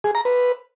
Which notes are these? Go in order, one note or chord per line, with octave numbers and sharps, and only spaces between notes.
G#4
A#5
B4